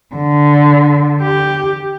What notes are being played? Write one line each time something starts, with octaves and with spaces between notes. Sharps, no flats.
D3
G4